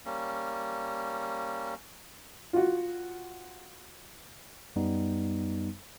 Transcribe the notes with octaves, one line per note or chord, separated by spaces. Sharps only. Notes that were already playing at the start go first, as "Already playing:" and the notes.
G3 A#3 C#4
F4 F#4
F#2 G3 B3 D#4